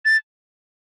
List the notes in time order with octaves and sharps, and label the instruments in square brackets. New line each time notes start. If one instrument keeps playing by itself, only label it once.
[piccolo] A6